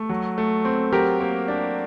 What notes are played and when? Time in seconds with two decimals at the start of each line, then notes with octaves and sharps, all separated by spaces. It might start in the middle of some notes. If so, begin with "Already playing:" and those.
Already playing: A3
0.09 F#3
0.38 A3
0.65 C4
0.93 F#3 G4 A#4
1.20 A#3
1.48 D4